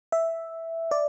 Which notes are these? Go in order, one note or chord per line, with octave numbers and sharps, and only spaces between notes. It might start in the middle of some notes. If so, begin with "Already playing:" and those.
E5
D5